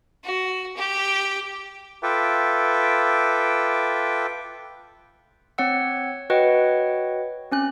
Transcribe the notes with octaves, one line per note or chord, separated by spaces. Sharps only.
F#4
G4
F4 A4 B4 E5 G5 D6
C4 C#5 F#5 E6
F#4 B4 C#5 D#5 F#5 G5
C4 C#4 F#6